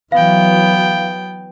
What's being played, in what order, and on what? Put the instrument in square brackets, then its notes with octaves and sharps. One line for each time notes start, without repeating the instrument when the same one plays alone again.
[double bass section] E3 F#3 [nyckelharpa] B3 G5 [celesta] F5